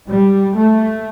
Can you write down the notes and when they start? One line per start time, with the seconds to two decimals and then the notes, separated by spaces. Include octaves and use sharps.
0.08 G3
0.55 A3